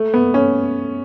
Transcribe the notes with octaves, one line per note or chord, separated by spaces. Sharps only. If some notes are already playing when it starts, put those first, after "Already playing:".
Already playing: A3
B3
C#4